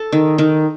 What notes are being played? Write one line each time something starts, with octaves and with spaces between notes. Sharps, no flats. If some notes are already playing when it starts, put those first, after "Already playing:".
Already playing: A4
D#3
D#3